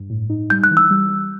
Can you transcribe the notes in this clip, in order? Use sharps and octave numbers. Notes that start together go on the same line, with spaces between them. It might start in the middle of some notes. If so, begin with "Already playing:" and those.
Already playing: G2
A2
D#4
G3 G6
F#6
E3
E6
G3
G3